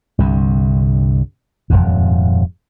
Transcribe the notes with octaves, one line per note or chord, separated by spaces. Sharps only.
C2 G2 D3
D#1 G#1 F2 G#2